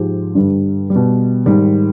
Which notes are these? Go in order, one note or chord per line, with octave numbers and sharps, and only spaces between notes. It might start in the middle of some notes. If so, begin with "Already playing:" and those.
Already playing: G#2 F3 G#3 G4
G2 D3 G3
G3
B2
G#2 D#3 G3